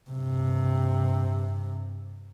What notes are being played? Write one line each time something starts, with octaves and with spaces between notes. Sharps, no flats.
G2 C3